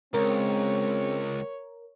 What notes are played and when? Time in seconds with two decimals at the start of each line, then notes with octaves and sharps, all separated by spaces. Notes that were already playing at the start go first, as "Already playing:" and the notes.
0.14 C#2 G#3 C4 A#4 C#5